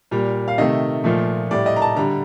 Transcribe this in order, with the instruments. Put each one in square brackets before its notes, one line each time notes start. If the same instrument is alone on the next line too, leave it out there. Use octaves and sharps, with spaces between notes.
[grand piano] A#2 G3
F5
C3 D#3 A3 D#5
A#2 F3 A3
A2 G3 D5
D#5
A#5
A5
D3 G3 A#5